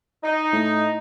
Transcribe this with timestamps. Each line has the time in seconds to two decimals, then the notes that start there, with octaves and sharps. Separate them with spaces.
0.23 D#4
0.53 A2